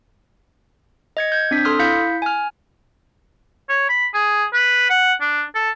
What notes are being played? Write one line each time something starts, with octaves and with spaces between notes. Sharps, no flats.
D#5 G#6 C#7
G6 G#6
C4 D4 B6
A4 C6 D#6 F6
E4 F5 G6 B6 C#7
G#5 F6
C#5
B5
G#4
B4
F#5
D4
A4